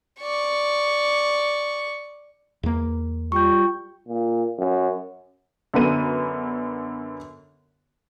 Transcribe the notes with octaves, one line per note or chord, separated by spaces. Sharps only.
D5 C#6
E2 A#3
G3 F4 G5 C#6 G6
A#2
F#2
F#2 D3 B3 D#7